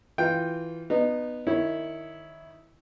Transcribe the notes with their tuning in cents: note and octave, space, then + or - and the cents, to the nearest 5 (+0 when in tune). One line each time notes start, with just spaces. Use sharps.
E3 +0 F4 +0 G5 +0
B3 +0 D#4 -25
D#3 -15 E4 -10 C#5 +0